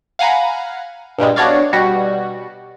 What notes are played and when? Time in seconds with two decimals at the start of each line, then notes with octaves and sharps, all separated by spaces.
0.19 F5 F#5 G#5 A#5 B5
1.18 G2 A#2 G3 G#3
1.36 B3 D4 F#4 C#5 D5 F5
1.73 B2 G3 F#4